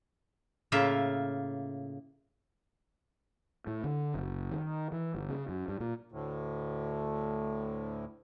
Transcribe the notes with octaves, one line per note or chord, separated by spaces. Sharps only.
A2 C#3 A#3 F4 E5
A2
D3
F#1
D#3
E3
G1
C#3
F#2
G2
A#2
D2 A2